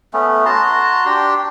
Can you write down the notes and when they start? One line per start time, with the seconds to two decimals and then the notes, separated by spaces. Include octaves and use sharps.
0.14 A3 B3 C#4
0.46 F#4 A5 A#5 C6
1.06 D4 G4 G5 C6